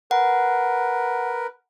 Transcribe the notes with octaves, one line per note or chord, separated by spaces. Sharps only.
A#4 B4 F#5